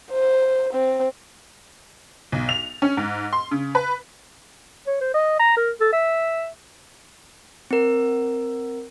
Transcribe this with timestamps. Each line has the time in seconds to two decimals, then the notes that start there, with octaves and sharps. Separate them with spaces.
0.12 C5
0.73 C4
2.32 B1
2.49 F7
2.82 C#4
2.97 G#2
3.33 C6
3.51 C#3
3.75 B4
4.87 C#5
5.01 C5
5.14 D#5
5.39 A#5
5.56 A#4
5.80 A4
5.92 E5
7.71 C4 A#4